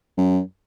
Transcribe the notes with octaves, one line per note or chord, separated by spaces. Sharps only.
F#2